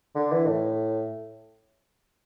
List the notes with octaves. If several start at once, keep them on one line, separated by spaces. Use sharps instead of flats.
D3
E3
A2